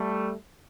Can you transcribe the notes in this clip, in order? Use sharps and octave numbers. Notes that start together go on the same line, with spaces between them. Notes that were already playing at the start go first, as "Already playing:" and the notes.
Already playing: G3 A3